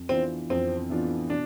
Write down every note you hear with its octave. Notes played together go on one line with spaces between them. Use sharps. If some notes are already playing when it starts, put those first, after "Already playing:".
Already playing: F2
E3 B3 C4 D4 F4
F2 C4
E3 B3 D4 F4
B2 D4